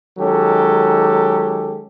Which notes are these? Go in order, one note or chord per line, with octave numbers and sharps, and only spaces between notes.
D#3 F#3 G#3 C#4 G4 A4